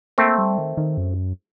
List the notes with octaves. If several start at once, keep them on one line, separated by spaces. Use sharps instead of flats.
A3 A#3 C4
G3
D#3
D#3
F#2